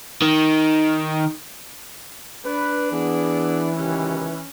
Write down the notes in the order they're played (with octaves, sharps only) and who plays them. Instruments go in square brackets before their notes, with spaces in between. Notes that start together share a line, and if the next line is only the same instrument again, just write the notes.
[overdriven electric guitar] D#3
[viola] D4 [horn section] B4
[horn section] E3 [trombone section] B3 G#4
[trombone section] C#2 D#3 G4 [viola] C#4